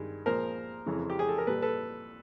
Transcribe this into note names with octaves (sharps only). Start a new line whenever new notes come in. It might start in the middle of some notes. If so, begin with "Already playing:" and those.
Already playing: G2 D#3 G#3
A#2 F3 G#3 A#4 C5
F2 C#3 E3 G#3
G4
G#4
A4
A#4
A#2 G3 A4 B4
A4 B4